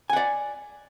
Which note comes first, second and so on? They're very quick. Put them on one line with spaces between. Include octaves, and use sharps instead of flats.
G#5 F#5 D5